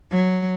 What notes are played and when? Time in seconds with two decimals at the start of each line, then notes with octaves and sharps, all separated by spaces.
0.12 F#3